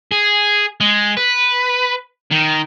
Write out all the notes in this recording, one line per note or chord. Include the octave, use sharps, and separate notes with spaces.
G#4
G#3
B4
D#3